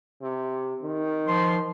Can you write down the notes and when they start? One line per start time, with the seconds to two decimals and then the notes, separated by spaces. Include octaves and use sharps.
0.22 C3
0.83 D#3
1.28 F3 C6